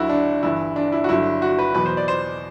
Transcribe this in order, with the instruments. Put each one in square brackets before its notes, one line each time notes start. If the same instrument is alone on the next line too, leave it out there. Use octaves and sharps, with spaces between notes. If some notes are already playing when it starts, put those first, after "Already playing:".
Already playing: [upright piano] D2 D3 F#3 E4 F#4
D4
G1 G2 E3 E4
D4
E4
F#4
G1 G2 D3 F#3 E4
F#4
B4
E2 B2 F#3 B4
C5
D5
C5